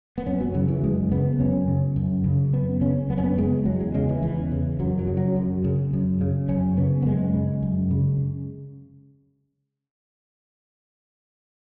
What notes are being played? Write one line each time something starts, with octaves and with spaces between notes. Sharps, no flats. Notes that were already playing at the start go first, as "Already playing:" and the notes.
B3
F#2 C#4
F#3
C#3 F#3
E3
F#2 G#3
C#3 B3
F#2 C#4
C#3
F#2
C#3
F#2 B3
C#3 C#4
F#2 B3
C#4
B3
C#3 G#3
E2 F#3
G#3
C#3 G#3
E3
E2 E3
C#3
F#2 F#3
F#3
C#3
F#3
F#2
C#3
F#2
C#3
F#2 C#4
C#3 B3
B3
F#2 G#3
C#3
F#2
C#3